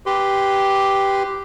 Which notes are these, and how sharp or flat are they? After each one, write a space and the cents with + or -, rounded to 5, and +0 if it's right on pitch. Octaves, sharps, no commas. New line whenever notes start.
G4 +0 B4 +0 C6 -15